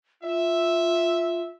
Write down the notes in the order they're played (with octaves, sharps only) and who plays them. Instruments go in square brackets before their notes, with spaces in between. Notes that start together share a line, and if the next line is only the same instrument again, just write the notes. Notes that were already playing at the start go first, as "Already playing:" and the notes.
[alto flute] F4 [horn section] E5